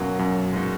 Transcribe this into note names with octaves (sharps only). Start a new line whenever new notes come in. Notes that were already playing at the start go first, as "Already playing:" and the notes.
Already playing: F#2 B2 F#3 A#3
F#2
A#2 G#3 B3 D#4 F#4